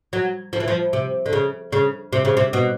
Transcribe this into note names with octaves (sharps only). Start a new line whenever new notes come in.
F#3
F3
E3
F3
C3
D3
C#3
C#3
C3
C#3
C3
B2